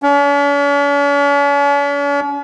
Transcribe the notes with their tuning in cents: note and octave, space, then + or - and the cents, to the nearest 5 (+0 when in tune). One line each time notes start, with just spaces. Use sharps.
C#4 +45